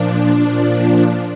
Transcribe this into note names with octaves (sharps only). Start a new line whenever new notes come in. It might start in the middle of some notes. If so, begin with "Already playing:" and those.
Already playing: A#2 F3 D4
A#2 F3